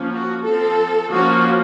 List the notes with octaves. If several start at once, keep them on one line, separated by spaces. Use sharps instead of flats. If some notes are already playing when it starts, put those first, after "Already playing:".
Already playing: F3 A#3 C#4
F#4
F3 C4 A4
F3 A#3 C#4 F#4